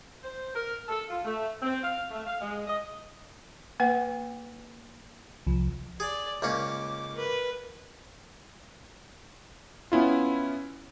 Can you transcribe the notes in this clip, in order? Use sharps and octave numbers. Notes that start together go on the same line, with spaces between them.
C5
A#4
A4
F4
A3
C4
F5
A3
F5
G#3
D#5
A#3 B4 F#5
C2 F3
G#4 D5
C#2 A#3 C#4 D6
A#4 B4
B3 C#4 E4 F4